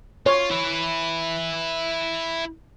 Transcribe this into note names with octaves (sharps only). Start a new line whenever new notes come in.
F4 C#5
E4 B4